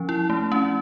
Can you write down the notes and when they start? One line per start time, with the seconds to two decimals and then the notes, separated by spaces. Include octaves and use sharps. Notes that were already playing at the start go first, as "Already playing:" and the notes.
Already playing: F3 C#4
0.09 E4
0.30 A3
0.52 C#4